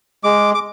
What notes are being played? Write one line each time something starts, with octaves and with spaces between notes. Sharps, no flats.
G#3 D6
D6